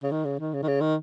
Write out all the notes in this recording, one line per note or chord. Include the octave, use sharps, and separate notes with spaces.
C#3
D#3
C#3
D#3
C#3
D#3
C#3
D#3